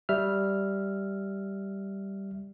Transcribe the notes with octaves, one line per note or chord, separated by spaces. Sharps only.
G3 E5 F6